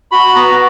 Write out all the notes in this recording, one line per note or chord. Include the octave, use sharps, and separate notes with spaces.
F#4 B5
B3 A#5